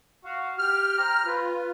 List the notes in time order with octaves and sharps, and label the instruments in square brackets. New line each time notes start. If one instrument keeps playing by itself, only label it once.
[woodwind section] F#4 F5
[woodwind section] G4 [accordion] F6
[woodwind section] C5 G5 A#5
[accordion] F4 [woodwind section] B4